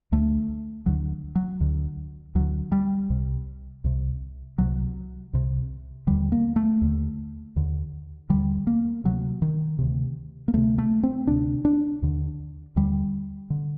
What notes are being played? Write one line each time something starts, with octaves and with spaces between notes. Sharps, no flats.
D2 D3 A3
D2 D3 F#3
F#3
D2 D3
D2 D3 F#3
G3
C2 C3
C2 C3
C2 C3 F#3
C2 C3
D#2 D3 G3
A#3
A3
D#2 D3
D#2 D3
D#2 D3 G3
A#3
D2 C3 F#3
D#3
D2 C3
A#3
D2 C3 A3
A3
C4
D2 C3 D4
D4
D#2 D3
D#2 D3 G3
D3